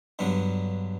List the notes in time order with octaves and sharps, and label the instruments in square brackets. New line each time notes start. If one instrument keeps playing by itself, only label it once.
[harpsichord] G2 D3 F#3 B3